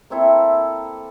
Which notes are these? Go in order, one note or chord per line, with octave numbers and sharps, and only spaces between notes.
A#3 C4 E4 A4